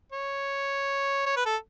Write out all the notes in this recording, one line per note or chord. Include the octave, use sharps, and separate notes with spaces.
C#5
C#5
B4
A4